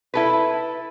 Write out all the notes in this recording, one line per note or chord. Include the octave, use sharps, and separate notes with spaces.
E4 A4 B4